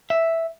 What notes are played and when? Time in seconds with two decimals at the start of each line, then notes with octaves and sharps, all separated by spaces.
0.10 E5